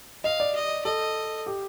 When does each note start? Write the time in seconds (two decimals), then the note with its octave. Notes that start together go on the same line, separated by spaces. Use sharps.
0.24 D#5 F5
0.40 D5
0.55 D#5
0.85 A4 D#5
1.46 G4